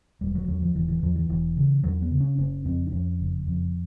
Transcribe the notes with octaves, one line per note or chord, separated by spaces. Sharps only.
E1 G3
F#3
E2 F#3
F3
E1 E3
E3
E2 F3
E3
E1 E3
C#3
E2 F#3
B3
C#3
C#4
F#1 C#4
F2 C4
D4
F2 C#4
F#1
F2